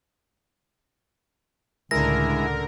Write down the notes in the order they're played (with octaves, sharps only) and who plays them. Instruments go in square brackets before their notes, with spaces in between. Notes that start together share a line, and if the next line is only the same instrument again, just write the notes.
[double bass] C#2 A2 [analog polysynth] D3 A#4 [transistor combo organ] G#3 E4 [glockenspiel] A#6